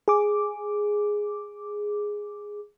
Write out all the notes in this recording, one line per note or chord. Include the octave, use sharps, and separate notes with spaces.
G#4 D6